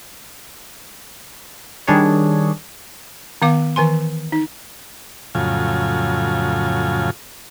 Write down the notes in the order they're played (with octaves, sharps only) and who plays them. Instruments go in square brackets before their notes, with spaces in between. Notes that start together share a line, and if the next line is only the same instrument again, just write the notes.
[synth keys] D#3 G3 D4 G#4 C#5
[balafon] D#3 B3 F5 D6
D#3 E3 G#5 C6
D#4
[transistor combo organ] F2 A2 C#3 F#3 F4 G#5